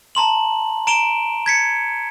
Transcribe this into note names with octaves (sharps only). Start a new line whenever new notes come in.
A5 A#5 C6 F#7
A#5 D7 E7 F7 G7
G#6 B6 C#7